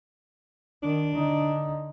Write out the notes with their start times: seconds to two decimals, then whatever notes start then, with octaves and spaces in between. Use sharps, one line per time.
0.83 D#3 D4
1.14 D3 D#4